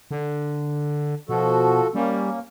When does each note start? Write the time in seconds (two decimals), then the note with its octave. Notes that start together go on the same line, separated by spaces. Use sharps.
0.11 D3
1.29 B2 F3 F#4 A4
1.95 G3 A#3 C#4